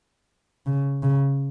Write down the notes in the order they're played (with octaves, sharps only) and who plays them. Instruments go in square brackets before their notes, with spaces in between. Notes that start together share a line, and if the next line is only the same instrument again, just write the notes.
[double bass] C#3
C#3